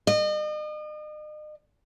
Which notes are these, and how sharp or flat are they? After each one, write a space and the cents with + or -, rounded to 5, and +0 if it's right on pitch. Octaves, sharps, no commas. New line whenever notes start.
D#5 -40